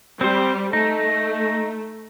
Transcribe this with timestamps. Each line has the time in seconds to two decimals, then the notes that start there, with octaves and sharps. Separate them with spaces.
0.21 G3 C4 C5
0.73 A3 D#4